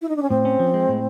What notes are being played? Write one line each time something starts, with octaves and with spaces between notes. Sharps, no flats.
E4
D#4
D4
C#4
A2 C4
C#4
F3
G#3
A2